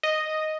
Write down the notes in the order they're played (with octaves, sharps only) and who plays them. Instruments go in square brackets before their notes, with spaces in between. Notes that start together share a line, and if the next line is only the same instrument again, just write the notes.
[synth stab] D#5